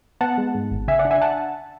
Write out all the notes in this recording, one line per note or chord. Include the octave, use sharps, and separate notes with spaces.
B3 F#5 A5
G#3
G#2
G#1
C#3 E5 G#5
D5 F#5
D4
E5 G#5
F#5 A5